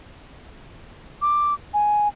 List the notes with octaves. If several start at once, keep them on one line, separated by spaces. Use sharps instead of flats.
D6
G#5